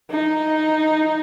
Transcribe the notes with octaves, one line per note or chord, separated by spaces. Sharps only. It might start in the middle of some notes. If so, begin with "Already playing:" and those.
D#4